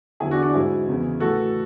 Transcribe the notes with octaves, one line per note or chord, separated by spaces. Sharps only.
E2 D3 F#3 E4 G#4
D4 F#4
D4 F#4
G#2 F#3 E4 G#4
E2 C#3 E3
A2 E3 F#4 A4